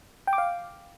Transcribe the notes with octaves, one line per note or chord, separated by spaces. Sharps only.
G5
D6
F5